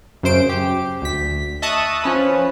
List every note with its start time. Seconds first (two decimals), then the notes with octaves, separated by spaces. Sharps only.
0.23 F#2 C#3 C5 D7
0.49 G4
1.02 D2 B6
1.62 D#5 E5 A5 C#6 D#6 F#6
2.04 F3 C#4 B4